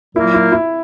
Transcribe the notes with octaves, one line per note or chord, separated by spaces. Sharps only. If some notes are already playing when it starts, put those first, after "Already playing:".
A#2 F#3 A#3 E4
E4
E4